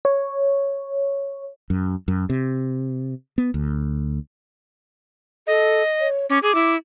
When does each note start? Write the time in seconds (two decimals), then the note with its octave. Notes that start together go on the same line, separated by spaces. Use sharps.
0.05 C#5
1.70 F#2
2.08 F#2
2.30 C3
3.38 B3
3.54 D2
5.47 A4 D#5
5.99 C#5
6.30 C#4 D6
6.43 G#4 D6
6.55 E4